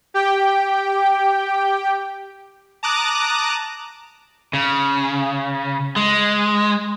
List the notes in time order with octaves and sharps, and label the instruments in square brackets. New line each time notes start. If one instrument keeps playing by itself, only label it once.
[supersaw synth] G4 G5
[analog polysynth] A5 A#5 D6 D#6 F#6
[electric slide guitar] C#3
G#3